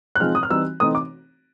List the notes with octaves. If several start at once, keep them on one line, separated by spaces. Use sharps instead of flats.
F#6
F3 G#3 C4 D#4 F6
D#6
F6
E3 G3 C4 D#4 E6
E3 A3 C4 D#4 D#6
D6